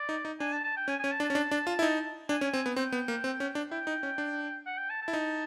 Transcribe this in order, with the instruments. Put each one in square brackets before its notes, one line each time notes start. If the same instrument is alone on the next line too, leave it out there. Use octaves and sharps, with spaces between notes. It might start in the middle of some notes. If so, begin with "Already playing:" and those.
Already playing: [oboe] D5
[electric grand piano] D#4
D#4
[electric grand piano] D4 [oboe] G#5
[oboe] A5
A5
G5
[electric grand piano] C#4 [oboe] G#5
[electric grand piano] C#4 [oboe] G#5
[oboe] A5
[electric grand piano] D4
[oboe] A5
[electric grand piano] C#4
D4
D4
F4
E4
D#4
[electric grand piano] D4 [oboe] G#5
[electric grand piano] C#4
C4
B3
[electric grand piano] C4 [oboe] G5
[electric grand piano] B3
A#3
C4
C#4
D4
[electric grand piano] E4 [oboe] G5
[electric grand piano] D#4
C#4
D4
[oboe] F#5
G5
A5
A5
[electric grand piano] E4
D#4